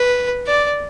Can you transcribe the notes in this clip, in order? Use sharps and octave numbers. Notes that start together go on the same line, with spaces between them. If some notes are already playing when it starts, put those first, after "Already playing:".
Already playing: B4
D5